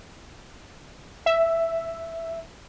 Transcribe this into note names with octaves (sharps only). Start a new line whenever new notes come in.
E5